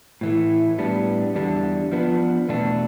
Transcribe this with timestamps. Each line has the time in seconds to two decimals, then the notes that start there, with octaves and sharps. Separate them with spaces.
0.21 A2 E3 A3
0.78 A2 G3 B3 D4
1.35 E2 D3 G3 D4
1.92 F3 B3 D4
2.48 E2 B2 A3 D4